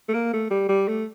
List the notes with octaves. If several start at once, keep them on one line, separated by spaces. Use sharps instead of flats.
A3
A#3
A3
G3
G3
A3